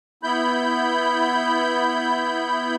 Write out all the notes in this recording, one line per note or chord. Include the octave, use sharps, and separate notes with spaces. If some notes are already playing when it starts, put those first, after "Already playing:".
B3 E4 B5 G6